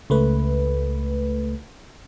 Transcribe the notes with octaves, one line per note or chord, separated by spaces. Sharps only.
C#2 A3 B4